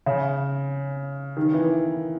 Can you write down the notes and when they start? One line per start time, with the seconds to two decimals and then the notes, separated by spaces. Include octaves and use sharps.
0.06 C#3
1.37 D#3
1.54 E3